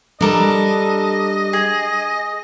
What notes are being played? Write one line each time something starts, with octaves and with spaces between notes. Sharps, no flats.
G3 D4 A4 A#4 D#5
G#4